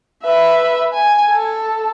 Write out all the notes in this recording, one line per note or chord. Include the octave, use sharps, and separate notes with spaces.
B4 E5
G#5
A4